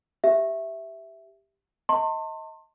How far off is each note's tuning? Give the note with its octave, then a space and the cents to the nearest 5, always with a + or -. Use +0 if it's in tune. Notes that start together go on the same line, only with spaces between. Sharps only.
G4 +0 E5 +0
D#5 +30 A5 +45 C6 +30